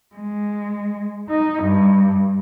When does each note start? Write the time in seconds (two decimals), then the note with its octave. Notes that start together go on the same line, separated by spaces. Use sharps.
0.15 G#3
1.30 D#4
1.63 G2